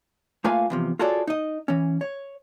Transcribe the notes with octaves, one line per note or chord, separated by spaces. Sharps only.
A3 A#3 F4 B4 F5 G#5
E2 C3 F3
F4 F#4 G#4 A4 C#5 D5
D#4 D#5
E3 C#4
C#5